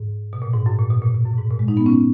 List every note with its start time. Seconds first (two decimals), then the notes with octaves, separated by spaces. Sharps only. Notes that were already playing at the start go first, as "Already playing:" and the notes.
Already playing: G#2
0.33 B2
0.42 A#2
0.54 G#2
0.66 F#2
0.79 A#2
0.90 B2
1.02 A#2
1.14 B2
1.26 F#2
1.34 A#2
1.38 G#2
1.51 A#2
1.59 G#3
1.68 D#4
1.77 B3
1.86 C#4